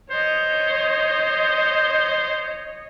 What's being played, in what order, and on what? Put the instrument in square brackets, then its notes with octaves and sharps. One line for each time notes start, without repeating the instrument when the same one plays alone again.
[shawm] C5 [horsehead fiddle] C#5 D#5